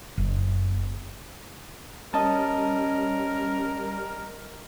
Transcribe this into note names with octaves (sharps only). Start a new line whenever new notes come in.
F#1
G3 C#4 A#4 D#5 A5